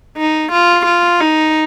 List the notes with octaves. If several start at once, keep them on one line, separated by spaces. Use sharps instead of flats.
D#4
F4
F4
D#4